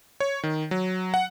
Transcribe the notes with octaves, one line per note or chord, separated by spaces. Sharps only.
C#5
D#3
F#3
F#5